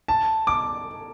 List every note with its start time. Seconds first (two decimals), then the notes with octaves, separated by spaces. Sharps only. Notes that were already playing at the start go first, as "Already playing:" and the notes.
0.08 A5
0.47 D6